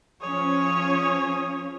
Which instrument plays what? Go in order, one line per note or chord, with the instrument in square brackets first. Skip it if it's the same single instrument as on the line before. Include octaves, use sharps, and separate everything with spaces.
[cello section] F3 C#4 [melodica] G#4 D#6 [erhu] C#5